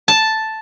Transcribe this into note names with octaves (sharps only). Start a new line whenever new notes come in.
A5